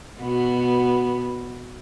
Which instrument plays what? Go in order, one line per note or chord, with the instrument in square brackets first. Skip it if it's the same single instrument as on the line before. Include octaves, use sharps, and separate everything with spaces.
[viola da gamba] B2 B3 F#4